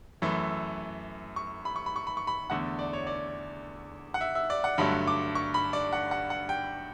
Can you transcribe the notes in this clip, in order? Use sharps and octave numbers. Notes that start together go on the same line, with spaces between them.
F#2 E3 A3
C#6
B5
C#6
B5
C#6
B5
C#6
B5
E2 D3 A3 F#5
D5
C#5
D5
F#5
E5
E5
D5
F#5
G2 D3 F#3 A3 B5
D6
C#6
B5
D5
F#5
F#5
F#5
G5